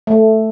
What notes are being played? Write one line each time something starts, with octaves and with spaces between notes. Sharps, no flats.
A3